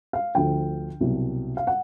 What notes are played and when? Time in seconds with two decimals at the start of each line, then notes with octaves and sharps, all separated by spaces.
0.13 F5
0.35 D2 D3 F3 G5
1.00 C2 B2 F#3
1.57 F5
1.67 F#5